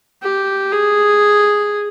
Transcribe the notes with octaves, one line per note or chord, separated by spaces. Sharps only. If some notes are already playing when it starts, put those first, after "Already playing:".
G4
G#4